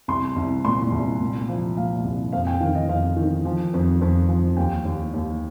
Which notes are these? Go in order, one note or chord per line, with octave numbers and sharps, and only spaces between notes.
C2 C6
C2
A#2 C6
C2
A#2
F3
A#2 F5
C2
F2 F5
G5
D#3 F5
D#5
F2 F5
D#3
F3
F2
F2
F3
D#2 G5
D#2
D#2